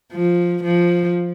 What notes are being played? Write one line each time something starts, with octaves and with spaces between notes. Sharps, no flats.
F3
F3